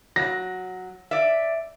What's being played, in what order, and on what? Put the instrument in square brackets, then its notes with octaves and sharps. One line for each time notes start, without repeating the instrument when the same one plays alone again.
[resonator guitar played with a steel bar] F#3 [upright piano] A#6
[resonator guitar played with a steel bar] D5 E5